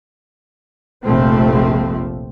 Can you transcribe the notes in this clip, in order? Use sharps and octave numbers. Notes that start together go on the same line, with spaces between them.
F1 A#1 F3 A3 C4